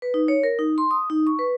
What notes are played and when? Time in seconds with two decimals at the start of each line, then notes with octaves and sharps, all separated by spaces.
0.02 B4
0.14 D#4
0.28 C#5
0.43 A#4
0.59 D#4
0.78 C6
0.91 D#6
1.10 D#4
1.27 C#6
1.39 B4